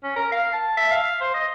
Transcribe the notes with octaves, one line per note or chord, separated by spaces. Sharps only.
C#4
A#4
F5
A5
E5
F5
C5
D#5